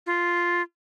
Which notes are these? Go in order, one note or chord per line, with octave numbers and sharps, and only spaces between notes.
F4